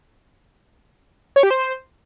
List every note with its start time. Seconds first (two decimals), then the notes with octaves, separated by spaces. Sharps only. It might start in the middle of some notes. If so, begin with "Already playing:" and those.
1.36 C#5
1.43 G4
1.50 C5